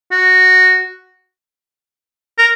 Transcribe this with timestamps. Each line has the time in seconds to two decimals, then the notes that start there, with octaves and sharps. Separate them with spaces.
0.12 F#4
2.38 A#4